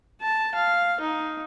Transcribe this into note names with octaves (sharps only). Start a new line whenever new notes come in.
A5
F5
D#4